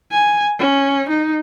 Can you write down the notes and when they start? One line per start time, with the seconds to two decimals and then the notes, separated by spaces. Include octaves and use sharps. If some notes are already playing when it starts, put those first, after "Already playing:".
0.12 G#5
0.59 C#4
1.09 D#4